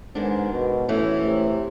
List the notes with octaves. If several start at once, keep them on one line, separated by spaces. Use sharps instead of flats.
D#2 G#2 D#3 G#3 B3 D4
B2
A2 E3 A3 C#4
C3